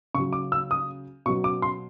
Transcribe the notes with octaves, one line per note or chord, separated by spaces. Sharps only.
C#3 F#3 C#6
D6
E6
D#6
B2 F#3 C#6
D6
C6